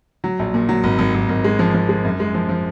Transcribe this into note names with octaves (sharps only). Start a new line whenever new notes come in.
F#3
A#1
A#2
F#3
G#1
G#1
G#1
G#1
G#3
F3
F3
G#3
F#2
G#3
F3
F3